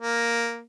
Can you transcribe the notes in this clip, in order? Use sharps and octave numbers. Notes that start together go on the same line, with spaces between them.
A#3